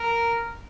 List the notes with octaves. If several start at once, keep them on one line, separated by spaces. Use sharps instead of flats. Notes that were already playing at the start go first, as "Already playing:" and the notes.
Already playing: A#4